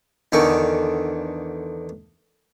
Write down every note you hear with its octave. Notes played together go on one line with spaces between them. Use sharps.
E2 D3 D#3 C#6